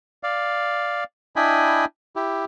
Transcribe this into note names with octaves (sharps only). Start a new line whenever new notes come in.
D5 F5
D4 E4 D#5 G5 G#5 B5
E4 G4